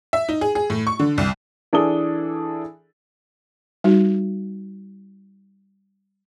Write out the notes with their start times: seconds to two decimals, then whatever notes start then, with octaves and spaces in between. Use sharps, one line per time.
0.13 E5
0.29 D#4
0.41 G#4
0.55 G#4
0.70 A2
0.87 C#6
0.99 D3
1.18 C2
1.73 E3 D4 G#4 A4 D#6 G7
3.84 G3 D#4 F#4